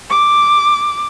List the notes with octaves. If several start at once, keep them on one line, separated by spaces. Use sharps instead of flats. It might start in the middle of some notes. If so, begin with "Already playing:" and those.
D6